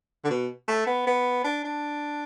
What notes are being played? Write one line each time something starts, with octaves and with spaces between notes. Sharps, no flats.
D3
B2
A3
B3
B3
D4
D4